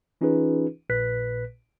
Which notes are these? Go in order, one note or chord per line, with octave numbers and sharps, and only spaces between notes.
E3 C#4 D#4 F4 G#4 B4
A#1 A#2 B4 F#6 B6